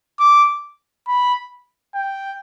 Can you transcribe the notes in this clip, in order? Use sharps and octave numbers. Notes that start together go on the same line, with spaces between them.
D6
B5
G5